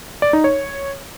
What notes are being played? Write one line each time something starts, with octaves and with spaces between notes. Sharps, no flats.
D5
D#4
C#5